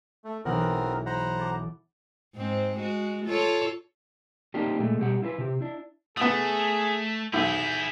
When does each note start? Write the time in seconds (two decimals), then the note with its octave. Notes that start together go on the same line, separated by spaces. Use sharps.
0.24 A3
0.45 B1 E3 B3 C4 A#4 F#5
1.06 C5 F#5 A#5 B5
1.39 A4 D6
2.35 G#2 C4
2.77 G#3 F#4
3.25 F4 A4 C#5
4.54 A#3 C4 D4 D#4 F4 G4
4.79 A#2 G#3 A3
4.98 B2 G3 G4 F#5
5.22 E4 F4 A#4 B4
5.38 C3 G4
5.61 D4 E4
6.17 A3 B3 G#4 D#6
7.33 B1 E4 G#4 G6